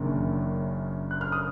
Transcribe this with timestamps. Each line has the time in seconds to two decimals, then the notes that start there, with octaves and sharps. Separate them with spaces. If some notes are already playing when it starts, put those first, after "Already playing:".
Already playing: F#1 F#2 D#3 A#3 D4
1.11 F#6
1.21 F6
1.32 D#6